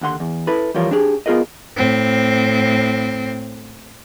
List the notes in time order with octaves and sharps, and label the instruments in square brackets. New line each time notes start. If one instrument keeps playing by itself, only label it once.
[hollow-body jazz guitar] D#2 D3 F#5 C6
E2
E4 A4 B4
E3 F3 G3 F4 A#4 C#5
D4 G4 G#4
B3 F4 G#4 A#4 D#5
[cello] A2 C4